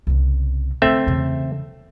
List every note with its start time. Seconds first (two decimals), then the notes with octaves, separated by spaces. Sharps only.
0.07 C2 C#3
0.82 D3 A3 C4 D4 E5
1.07 E2 C#3